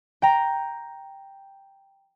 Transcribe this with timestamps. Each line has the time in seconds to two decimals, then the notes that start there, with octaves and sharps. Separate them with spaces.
0.22 G5 A#5